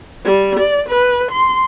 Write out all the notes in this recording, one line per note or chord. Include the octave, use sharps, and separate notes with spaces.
G3
D5
B4
C6